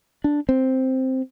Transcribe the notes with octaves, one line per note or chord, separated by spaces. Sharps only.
D4
C4